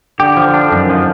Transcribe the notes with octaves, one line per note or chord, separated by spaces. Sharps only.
D3 G4
F3
D4
F#2 D#3
F3